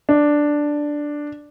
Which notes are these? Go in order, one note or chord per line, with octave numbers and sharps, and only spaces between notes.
D4